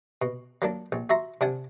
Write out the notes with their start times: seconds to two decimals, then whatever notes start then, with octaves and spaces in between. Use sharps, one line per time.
0.22 B2
0.62 F#3 A#3 D4
0.92 A#1
1.10 F#4 E5 A#5 C6
1.41 C3 D4 F#5 G#5